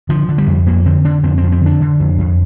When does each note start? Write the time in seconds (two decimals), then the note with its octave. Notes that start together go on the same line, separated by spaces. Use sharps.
0.09 D3 F3
0.29 D3
0.38 G3
0.47 F2
0.67 F2 A#3
0.86 D3 C4
1.05 D3 D4
1.23 F2 C4
1.38 F2 C4
1.52 C4
1.61 D3 D4
1.81 D3
1.99 F2
2.18 F2